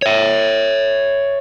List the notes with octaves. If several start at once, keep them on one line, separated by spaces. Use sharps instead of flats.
C#5 E5